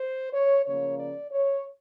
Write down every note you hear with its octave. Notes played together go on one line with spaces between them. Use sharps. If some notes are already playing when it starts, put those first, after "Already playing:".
Already playing: C5
C#5
C#3 F3 A#3 C#5
D5
C#5